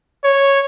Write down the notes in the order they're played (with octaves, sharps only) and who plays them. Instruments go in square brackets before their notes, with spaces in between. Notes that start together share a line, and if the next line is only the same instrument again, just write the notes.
[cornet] C#5